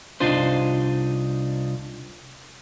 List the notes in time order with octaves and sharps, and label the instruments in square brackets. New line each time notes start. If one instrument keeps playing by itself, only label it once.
[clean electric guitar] C2 D4 D#4 F4 C5